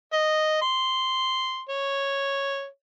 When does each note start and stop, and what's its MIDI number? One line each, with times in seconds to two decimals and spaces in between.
0.13 0.58 75
0.62 1.61 84
1.69 2.66 73